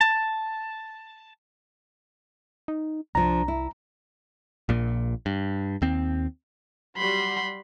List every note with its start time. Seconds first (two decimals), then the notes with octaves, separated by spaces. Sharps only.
0.01 A5
2.68 D#4
3.15 C2 F3 D4 A#5
3.48 E4
4.69 A#1 A#2
5.26 G2
5.82 D#2 C4
6.98 F#3 G3 F#4 B5 C6